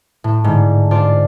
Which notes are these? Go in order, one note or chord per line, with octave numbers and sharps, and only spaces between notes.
A2
G#2 D3
D4 F4 C5 D5